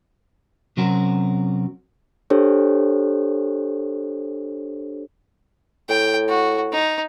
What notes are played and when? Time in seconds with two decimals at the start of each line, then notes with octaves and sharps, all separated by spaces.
0.77 C3 F#3 C4 C#4 F#4 A#4
2.30 D4 G4 A4 C5 C#5
5.89 A2 G5
6.29 F#4
6.73 D#4